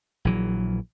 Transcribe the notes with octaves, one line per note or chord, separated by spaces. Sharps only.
A#1 E3 F#3